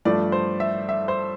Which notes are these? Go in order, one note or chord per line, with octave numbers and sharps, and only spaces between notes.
G2 F3 A3 D5
C5
E5
E5
C5